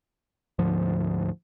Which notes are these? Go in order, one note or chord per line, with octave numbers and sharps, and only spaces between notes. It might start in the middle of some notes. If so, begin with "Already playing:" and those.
D2 G#2 F3